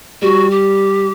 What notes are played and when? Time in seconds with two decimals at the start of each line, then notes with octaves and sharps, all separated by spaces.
0.22 G3 F#4
0.51 G4